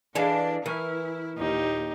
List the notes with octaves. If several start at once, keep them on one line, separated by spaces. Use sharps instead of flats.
E3 D4 G#4 A4 D5 D#5 F5
E3 E4 A#4 C#6 F6
D#2 A#2 D#4 G4